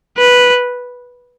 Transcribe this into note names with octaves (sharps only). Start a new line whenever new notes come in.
B4